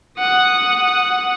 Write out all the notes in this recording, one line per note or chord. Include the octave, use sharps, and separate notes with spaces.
F#5 D#6